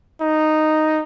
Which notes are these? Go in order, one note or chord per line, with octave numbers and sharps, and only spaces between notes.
D#4